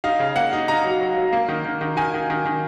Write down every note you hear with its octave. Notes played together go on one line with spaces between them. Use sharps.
D#4 F5
C#3
A#3 F#5
D#4
D#4 A#5
F#3
F#3
F#3
A#3
D#3
D#3
D#3
D#3 G#5
D#3
D#3
D#3